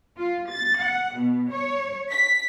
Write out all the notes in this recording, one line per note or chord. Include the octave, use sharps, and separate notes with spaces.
F4
A6
F#5
B2
C#5
B6